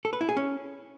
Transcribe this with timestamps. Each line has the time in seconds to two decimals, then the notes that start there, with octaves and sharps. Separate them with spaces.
0.05 A4
0.13 B4
0.21 E4
0.29 G#4
0.37 C#4